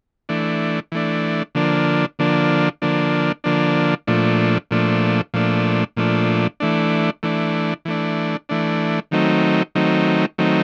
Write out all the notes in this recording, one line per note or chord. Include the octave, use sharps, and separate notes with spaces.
E3 A3 D4
E3 A3 D4
D3 F3 A#3 D4
D3 F3 A#3 D4
D3 F3 A#3 D4
D3 F3 A#3 D4
A#2 F3 A3 D4
A#2 F3 A3 D4
A#2 F3 A3 D4
A#2 F3 A3 D4
E3 A3 D4
E3 A3 D4
E3 A3 D4
E3 A3 D4
D#3 F#3 A3 C4 D#4
D#3 F#3 A3 C4 D#4
D#3 F#3 A3 C4 D#4